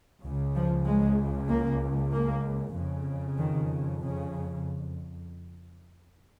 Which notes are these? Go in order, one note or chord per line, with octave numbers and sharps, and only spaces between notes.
C#2 C#3
F3
G#3
A#3
A#3
F2 C#3
D#3
C#3